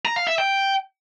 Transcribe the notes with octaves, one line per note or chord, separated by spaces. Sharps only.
A#5
F5
E5
G5